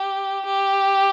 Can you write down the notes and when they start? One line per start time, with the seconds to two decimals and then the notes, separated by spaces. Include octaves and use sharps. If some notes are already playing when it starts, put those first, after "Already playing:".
Already playing: G4
0.46 G4